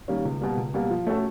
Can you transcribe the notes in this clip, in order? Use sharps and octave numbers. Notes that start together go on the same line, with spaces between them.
D#3 G3 A#3 C#4
C#2
B2 G3 A#3
C#2
B2 G3 A#3
F3
A3 C#4 F#4 A4